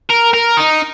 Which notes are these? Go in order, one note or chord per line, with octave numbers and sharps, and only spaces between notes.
A#4
A#4
D#4